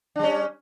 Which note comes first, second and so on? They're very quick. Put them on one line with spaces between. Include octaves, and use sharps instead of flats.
D4 G3 C#4